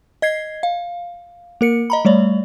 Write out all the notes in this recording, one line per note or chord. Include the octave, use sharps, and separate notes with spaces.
D#5 G#6 C7
F5
A#3 A#4 C#7
D#5 A#5 B5
G3 A3 C#5 D5